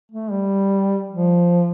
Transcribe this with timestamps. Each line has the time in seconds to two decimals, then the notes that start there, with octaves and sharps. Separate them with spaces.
0.12 A3
0.31 G3
1.10 F3